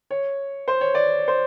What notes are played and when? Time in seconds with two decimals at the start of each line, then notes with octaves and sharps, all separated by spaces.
0.11 C#5
0.68 C5
0.81 C#5
0.95 D5
1.28 C5